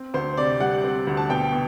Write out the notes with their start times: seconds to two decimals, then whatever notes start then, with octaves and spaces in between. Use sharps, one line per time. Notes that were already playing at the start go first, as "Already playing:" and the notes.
Already playing: C4
0.14 D2 C5
0.37 C3 D5
0.60 G3 F#5
0.84 C4
1.07 D2
1.17 A5
1.29 B2 G5
1.53 B2